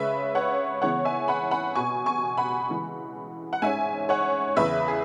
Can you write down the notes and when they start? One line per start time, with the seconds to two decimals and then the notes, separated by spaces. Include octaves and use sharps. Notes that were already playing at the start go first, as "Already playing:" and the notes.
Already playing: C#3 G#3 C#4 B4 E5
0.35 C#5 F#5
0.82 C#3 E3 B3 C#5 F#5
1.05 E5 G#5
1.28 F#5 B5
1.51 F#5 B5
1.75 B2 B3 G#5 C#6
2.06 G#5 C#6
2.37 F#5 B5
2.69 C#3 E3 G#3
3.53 F#5
3.62 G#2 G#3 C#4 E5 G#5
4.09 C#5 F#5
4.57 E2 C#3 E3 B4 E5
4.88 G#4